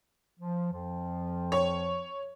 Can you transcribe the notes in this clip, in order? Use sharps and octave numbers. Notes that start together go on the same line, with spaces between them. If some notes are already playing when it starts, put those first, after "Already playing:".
F3
F2 F3
C#5